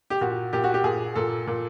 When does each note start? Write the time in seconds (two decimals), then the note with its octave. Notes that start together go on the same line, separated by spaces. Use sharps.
0.10 G4
0.21 A#2 F#4
0.53 A#2 G4
0.64 F#4
0.74 G4
0.84 A#2 G#4
1.15 A#2 A4
1.47 A#2